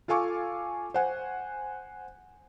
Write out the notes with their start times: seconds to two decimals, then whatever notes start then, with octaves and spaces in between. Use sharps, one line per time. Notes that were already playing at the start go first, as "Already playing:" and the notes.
0.08 F4 A4 F5 G#5 C#6 D6
0.94 C5 F#5 G#5